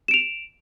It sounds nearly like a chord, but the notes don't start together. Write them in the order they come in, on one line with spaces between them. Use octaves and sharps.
E7 D7 F7